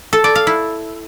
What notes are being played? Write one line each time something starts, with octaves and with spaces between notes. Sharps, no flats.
A4
D5
F5
E4